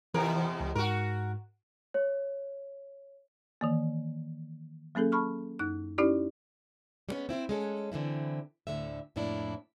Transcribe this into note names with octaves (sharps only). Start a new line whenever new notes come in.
E2 C3 E3 A#4 A#5
C#2
G#2 F#4 A#4
C#5
D#3 E3 A#3
F#3 A#3 C#4 G#4 A4
A5 B5 C#6 F6
F#2 D#4 F#6
C#4 D#4 E4 G4 D5
G3 G#3 B3 C#4
C4 E4 B4 C5
G#3 C#4 A4
D3 E3 C4 E4
D2 A2 D3 E5
F2 A2 A#3 D4 E4